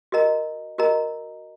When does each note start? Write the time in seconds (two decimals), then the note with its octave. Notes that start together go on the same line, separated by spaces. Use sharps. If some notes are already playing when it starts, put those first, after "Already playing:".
0.12 F#4 A#4 D#5 A#5
0.78 F#4 A#4 D#5 A#5